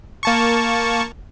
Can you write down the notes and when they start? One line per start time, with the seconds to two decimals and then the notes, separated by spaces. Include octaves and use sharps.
0.23 A#3 A5 C#6